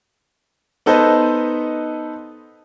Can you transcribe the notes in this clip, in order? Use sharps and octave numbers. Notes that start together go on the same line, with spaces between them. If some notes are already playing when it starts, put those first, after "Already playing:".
B3 D#4 A4 B4 C5 D#5